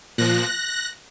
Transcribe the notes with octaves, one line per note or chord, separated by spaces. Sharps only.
A#2 F3 F#6 A#6